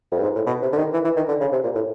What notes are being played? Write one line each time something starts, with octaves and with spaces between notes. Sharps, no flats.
F2
G2
G#2
A2
B2
C3
D3
D#3
E3
E3
D#3
D3
C#3
C3
A#2
A2